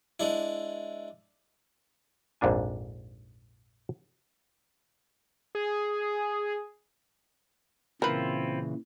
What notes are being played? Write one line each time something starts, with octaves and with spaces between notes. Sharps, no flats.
G#3 D4 E4
A#1 F2 G#2 D4 G#5
G#4
A#2 C#3 E3 C4 E4 F4 A#4 B4